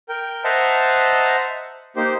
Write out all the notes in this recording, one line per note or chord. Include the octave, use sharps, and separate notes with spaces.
A#4 G5
C5 D#5 E5 F#5 A5 A#5
A#3 D#4 G4 C5